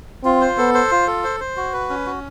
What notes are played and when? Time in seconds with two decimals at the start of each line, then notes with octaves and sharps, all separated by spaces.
0.24 C4 F4
0.41 C5
0.58 B3 A4
0.74 C5
0.91 F4
1.07 A4
1.24 C5
1.40 C5
1.57 F#4
1.73 B4
1.90 C#4
2.06 F#4